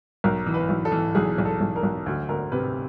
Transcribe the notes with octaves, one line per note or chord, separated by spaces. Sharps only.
B1 A#4
E3
B4
B1
A4
E3
B1 G#4
B1
A4
B1
A#4
B1
D2
D2 A#4
C3 B4